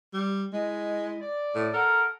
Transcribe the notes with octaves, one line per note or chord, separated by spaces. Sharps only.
G3
G#3 E4 D#5
D5
A2
A4 A#4 F#5